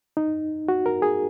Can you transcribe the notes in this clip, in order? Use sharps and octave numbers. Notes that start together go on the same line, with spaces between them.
D#4
F#4
A#4
G#4